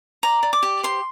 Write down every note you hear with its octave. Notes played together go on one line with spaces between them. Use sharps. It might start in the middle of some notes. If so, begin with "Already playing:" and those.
D5 A#5
D5
D6
G4
C5 C6